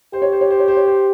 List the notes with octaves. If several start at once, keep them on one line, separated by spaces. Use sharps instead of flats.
G4 C5
C#5
C5
C#5
C5
C#5
C5
C#5
C5